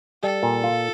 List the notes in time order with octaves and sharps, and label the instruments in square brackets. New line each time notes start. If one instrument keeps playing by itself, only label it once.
[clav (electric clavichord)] G3 [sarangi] A4
[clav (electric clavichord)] A#2
F4